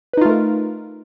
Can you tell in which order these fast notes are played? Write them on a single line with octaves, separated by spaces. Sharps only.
B4 D#4 F4 A3 A#4